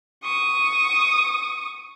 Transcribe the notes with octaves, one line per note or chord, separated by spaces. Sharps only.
C#6 D#6